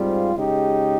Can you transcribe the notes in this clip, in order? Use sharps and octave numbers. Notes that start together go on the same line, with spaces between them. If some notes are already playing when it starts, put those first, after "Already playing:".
Already playing: G#2 G3 C4 F4
C#3 G#3 D#4 G4